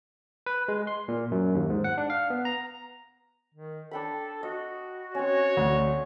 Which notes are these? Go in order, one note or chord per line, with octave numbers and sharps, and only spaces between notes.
B4
G#3
C6
A#2
F#2
D#2
G#2
F#5
D4
F5
B3
A#5
D#3
D4 A4 G5 B5
F#4 D#5
C4 C#4 C#5
D2